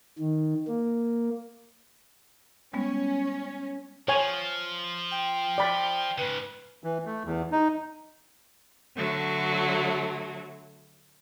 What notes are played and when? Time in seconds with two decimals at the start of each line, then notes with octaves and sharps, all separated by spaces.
0.19 D#3
0.68 A#3
2.74 G3 G#3 B3 C#4
4.08 F3 C#5 G#5
5.11 G5
5.58 D5 B5
6.18 G#2 C#3 B4
6.84 E3
7.06 A3
7.25 E2
7.52 D#4
8.97 D3 F#3 A3